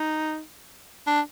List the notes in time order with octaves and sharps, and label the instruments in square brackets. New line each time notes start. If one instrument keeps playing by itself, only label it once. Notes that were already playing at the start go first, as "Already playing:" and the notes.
Already playing: [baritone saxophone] D#4
D4